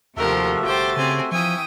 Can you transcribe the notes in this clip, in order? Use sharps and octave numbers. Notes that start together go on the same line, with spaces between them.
D#2 C3 F3 A3 F#4 G4 A#4 E5
G1 G4 C5 G5 A6
C#3 C4 G#5
E3 F3 E5 G5 G#5 C#6 D#6